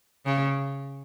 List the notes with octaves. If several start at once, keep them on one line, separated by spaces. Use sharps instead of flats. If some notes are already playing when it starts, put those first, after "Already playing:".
C#3